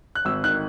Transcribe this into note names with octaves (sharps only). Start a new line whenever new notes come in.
F#6
G#1 E6
D#3 F#6